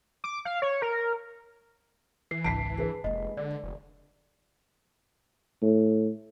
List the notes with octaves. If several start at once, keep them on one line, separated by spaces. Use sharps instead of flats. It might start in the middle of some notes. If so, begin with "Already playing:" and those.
D6
F5
C#5
A#4
E3 C7
G#1 C#2 A5 B6 C7 D7
G#4 B4
F1 G#3 A#3 D#5
D3 D5
F1
A2